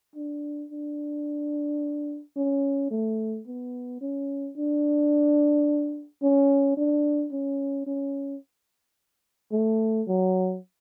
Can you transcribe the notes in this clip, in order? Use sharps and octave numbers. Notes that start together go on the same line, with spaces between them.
D4
D4
C#4
A3
B3
C#4
D4
C#4
D4
C#4
C#4
A3
F#3